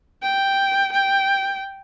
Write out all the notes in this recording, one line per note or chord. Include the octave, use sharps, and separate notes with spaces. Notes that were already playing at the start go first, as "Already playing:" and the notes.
G5
G5